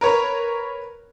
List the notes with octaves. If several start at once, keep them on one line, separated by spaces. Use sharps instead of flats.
A#4 B4 C#5 A#5